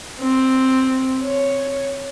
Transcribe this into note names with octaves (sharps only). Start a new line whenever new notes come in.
C4
C#5